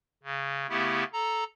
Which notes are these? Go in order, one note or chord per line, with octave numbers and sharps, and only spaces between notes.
C#3
C#3 A3 B3 E4 G4
A4 A#5